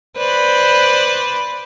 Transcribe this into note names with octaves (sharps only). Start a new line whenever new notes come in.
B4 C5 D5